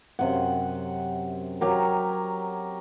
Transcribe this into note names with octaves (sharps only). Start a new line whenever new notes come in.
F#2 C3 F#5
F#3 G4 A#4